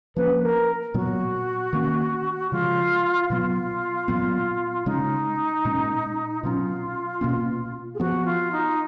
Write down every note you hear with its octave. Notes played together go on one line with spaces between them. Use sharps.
F3 A#3 C#4 B4
A#4
A#2 F#3 B3 F#4
D#3 A#3 C#4
C#3 F3 G#3 F4
B2 F#3 B3 F4
A#2 F#3 B3
C#3 G#3 C#4 D#4
A#2 G#3 C#4
B2 F#3 C#4 F4
B2 A#3 C#4
G#4
F3 B3 F#4
F4
D#4